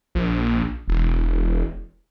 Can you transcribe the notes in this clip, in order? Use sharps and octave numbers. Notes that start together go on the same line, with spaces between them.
A#1
E1